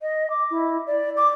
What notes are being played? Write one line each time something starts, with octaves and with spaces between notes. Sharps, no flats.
D#5
D6
E4
D5
D6